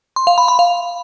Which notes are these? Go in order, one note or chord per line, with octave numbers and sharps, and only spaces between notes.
C6
F5
B5
B5
F5